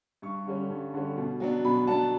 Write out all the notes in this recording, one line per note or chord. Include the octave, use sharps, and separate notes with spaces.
G2 C#6
D3 G3 C#4
G2
D3 G3 C#4
B2
F#3 B3 D4
B2 B5
F#3 B3 D4 A5